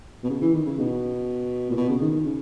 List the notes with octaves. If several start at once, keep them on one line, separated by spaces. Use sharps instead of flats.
B2
C#3
E3
D#3
C#3
B2
A#2
B2
C#3
D#3
D#3
C#3